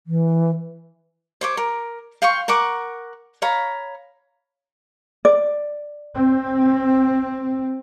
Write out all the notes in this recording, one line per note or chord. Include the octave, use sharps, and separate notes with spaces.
E3
C5 C#5 D6
A#4
F5 G5 C6 C#6
A#4 F#5 C#6 D6
C#5 F5 A#5 B5
D5
C4